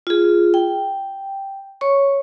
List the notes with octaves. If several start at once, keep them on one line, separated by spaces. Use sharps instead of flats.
F4 G#4
G5
C#5 C#6